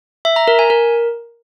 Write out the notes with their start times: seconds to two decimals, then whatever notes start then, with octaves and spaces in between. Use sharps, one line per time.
0.25 E5
0.36 A#5
0.48 A#4
0.59 G#5
0.70 A#4